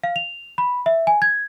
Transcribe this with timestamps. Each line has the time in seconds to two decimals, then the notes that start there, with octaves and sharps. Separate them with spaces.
0.03 F5
0.16 F7
0.58 B5
0.86 E5
1.07 G#5
1.22 G#6